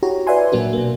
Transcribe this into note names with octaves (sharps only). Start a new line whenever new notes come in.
E4 F#4 G4 C#5 A#5
B4 D5 E5 F#5 G#5 C6
A#2 F#3 A#3 D4 F#4
B2 A#3